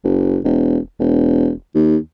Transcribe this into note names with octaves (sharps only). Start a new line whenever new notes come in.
F#1
E1
E1
D#2